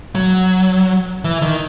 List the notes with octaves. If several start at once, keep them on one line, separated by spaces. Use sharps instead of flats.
F#3
E3
D#3